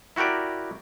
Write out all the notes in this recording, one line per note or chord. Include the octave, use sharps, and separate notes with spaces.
E4 F#4 G4 A#4 D5